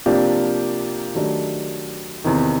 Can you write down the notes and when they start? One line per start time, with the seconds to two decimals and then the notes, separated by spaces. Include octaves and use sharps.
0.06 C3 F3 A#3 D4 G4
1.15 D#3 F#3 A3 D4 G4
2.24 E2 C3 D#3